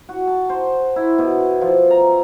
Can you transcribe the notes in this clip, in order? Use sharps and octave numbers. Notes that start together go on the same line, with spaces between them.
F#4
A5
C5
E4
B2
F3
A#5